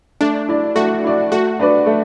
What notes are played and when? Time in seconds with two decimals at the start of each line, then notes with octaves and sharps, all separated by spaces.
0.21 A3 D4
0.48 E4 D5
0.75 A3 F#4
1.04 E4 D5
1.32 A3 F#4
1.60 D4 B4 D5
1.86 A3